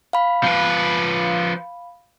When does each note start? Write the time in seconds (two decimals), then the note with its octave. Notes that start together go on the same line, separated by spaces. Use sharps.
0.13 F5 B5
0.44 F3 B4